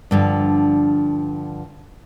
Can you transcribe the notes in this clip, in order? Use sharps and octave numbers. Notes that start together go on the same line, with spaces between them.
G2 D3 F3